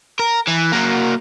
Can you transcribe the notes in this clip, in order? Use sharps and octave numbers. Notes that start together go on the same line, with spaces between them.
A#4
E3
F#3 A#3